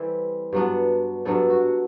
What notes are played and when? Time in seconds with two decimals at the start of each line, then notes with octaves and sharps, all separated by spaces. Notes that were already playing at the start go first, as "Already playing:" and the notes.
Already playing: E3 G3 C4 A4
0.53 G2 F#3 B3 D4
1.25 G2 F#3 B3 D4 A4
1.50 F#4